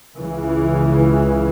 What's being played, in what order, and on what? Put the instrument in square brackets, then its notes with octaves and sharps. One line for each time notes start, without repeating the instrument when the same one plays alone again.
[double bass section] C#2 C#3 E3